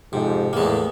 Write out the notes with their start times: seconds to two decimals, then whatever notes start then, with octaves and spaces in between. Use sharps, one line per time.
0.13 F2 G#2 C3
0.53 E2 A2 G#3 A#3